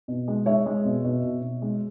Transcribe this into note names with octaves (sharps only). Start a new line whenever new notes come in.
B2
G#3
G#3 C#5 E5
G#3
B2
B2
B2
B2
G#3